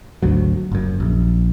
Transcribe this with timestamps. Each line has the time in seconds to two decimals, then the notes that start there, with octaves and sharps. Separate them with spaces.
0.22 G#1 D2 F#3
0.72 F#1 F#2
1.00 A#1